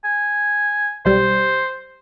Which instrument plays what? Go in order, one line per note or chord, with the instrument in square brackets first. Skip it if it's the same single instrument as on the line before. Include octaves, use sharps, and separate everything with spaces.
[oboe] G#5
[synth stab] B1 G3 [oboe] C5